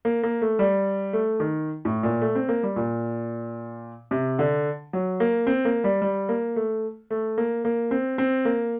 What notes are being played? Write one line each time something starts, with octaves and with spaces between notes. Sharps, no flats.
A#3
A#3
A3
G3
A3
D#3
A2
A#2
A3
C4
A#3
G3
A#2
C3
D3
F#3
A#3
C4
A#3
G3
G3
A#3
A3
A3
A#3
A#3
C4
C4
A#3